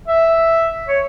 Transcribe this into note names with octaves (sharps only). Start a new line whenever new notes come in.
E5
C#5